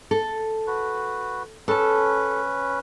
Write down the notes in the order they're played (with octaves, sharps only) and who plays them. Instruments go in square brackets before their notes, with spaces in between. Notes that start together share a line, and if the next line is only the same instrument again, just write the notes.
[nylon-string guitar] A4
[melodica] F#4 B4
[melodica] C#4 B4 [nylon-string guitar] A4 A5